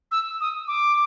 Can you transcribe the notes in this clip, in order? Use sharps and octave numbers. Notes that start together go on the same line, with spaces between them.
E6
D#6
D6